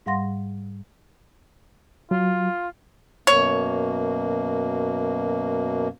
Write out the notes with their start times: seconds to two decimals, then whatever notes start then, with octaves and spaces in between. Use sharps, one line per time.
0.06 G#2 G3 F5 F#5 C6 A#6
2.11 F#3 F4
3.27 F#2 B2 A#3 C#5